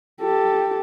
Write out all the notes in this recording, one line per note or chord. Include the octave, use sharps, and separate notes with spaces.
G4 A4